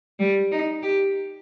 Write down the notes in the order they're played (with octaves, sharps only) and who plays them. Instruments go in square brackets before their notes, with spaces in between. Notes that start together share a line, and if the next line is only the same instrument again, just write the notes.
[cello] G3
D#4
G4